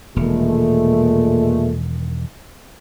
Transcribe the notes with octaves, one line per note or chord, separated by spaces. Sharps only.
E1 A#2 D#3 G#3 A3